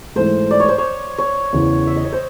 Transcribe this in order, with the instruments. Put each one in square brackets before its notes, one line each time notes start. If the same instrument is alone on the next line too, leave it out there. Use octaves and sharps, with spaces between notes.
[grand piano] G#2 E3 A3 [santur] C5
[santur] D5
C#5
C5
C#5
C#5
[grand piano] E2 C#3 E3
[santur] E5
D#5
C#5
C5